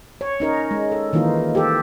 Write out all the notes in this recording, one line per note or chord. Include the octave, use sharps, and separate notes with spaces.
C#5
C#4 D#4 A#4
G#3
A4
D#3 E3 A#3 D#4 F4
G4 A4